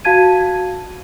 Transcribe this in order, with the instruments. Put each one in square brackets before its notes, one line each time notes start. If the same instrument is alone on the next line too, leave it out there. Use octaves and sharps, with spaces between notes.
[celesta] F#4 F5 A5 G#6 D#7